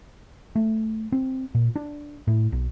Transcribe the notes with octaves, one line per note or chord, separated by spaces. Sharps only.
A3
C4
A#2
D4
A2
B1